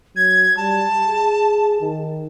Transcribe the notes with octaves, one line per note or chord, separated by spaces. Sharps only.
F#3 G#6
G3 A5
G#4
D#3